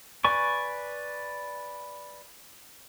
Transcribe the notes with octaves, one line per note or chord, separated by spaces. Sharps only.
B4 D5 G#5 C#6